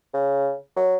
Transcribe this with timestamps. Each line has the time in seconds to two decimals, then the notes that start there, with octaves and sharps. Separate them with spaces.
0.14 C#3
0.76 F#3